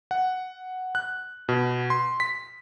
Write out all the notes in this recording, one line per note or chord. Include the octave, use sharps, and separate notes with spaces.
F#5
F#6
B2
C6
B6